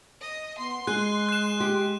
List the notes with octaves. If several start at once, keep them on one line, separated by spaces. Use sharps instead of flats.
D#5
B3 C6
G#3 G#4 F#6 D#7
F#6 E7
G4